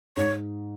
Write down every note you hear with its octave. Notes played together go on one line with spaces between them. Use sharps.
G#2 C#5